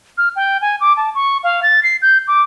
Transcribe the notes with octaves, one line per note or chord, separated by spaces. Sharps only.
F6
G5
G#5
D6
A5
C#6
F5
A6
C7
G6
D6